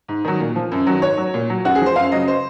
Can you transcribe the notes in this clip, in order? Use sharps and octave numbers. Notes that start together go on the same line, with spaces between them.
G#2
D#3 F#3
A#2
F3
F#2
D#3 F#3
G#2 C#5
F#3
A#2
F#3
F#2 F#4
G#4
F3 C5
F#2 F5
C#3 F#3 D#5
C5